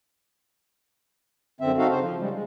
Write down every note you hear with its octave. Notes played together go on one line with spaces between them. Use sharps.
F#2 D3 C4 E5
C4 D#4 F#4 A4 F5
C#3 C5
F3
C#3 G3 G#3
G#3